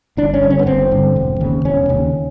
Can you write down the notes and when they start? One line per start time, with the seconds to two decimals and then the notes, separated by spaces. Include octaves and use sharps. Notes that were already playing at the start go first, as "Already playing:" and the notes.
0.17 G1 D4
0.34 C#4
0.42 G2 D3
0.50 C#4
0.59 B3
0.66 G1 C4
0.91 G2 D3
1.16 E1
1.41 D#2 C#3
1.65 E1 C#4
1.89 D#2 C#3